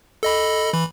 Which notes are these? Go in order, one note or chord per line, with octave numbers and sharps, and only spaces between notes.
A4 D#5 B5
E3 B5